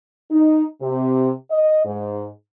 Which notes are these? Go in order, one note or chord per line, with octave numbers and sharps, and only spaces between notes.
D#4
C3
D#5
G#2